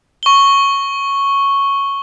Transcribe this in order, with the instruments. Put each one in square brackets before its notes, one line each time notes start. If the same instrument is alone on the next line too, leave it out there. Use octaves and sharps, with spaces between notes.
[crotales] C#6 G7